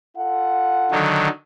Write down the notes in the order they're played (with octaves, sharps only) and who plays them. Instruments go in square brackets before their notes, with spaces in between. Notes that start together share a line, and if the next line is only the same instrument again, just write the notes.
[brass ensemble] F4 A4 F#5
[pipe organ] D3 D#3 F#3